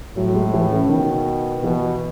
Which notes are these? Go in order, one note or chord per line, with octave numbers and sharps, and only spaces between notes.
A2 F#3
G#3
E3
C#3
B2 D#3
B2 E3